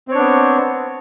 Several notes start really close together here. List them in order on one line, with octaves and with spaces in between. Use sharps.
C4 C#5 D4 B3